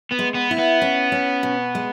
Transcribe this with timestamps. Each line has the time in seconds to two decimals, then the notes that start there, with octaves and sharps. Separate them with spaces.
0.11 B3
0.19 G#3
0.34 B3
0.51 E4
0.59 B3
0.82 C#4
1.12 C#4
1.43 B2
1.75 G#3